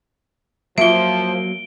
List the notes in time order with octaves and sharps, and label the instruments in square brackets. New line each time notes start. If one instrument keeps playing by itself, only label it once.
[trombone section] F3 [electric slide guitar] F#3 A#3 [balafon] F4 E5 [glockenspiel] D7 G7